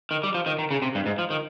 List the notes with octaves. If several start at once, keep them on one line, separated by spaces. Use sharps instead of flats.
D#3
G3
F3
D#3
D#3
C#3
C3
G2
G#2
F3
D#3